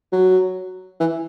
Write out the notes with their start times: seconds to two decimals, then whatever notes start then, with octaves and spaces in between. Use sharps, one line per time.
0.12 F#3
1.00 E3